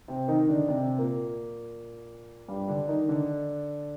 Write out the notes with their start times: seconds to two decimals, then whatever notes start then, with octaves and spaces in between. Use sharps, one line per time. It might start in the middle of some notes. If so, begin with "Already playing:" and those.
0.08 C3 C4
0.28 D#3 D#4
0.48 D3 D4
0.68 C3 C4
0.98 A#2 A#3
2.48 G2 G3
2.68 D3 D4
2.88 D#3 D#4
3.08 D3 D4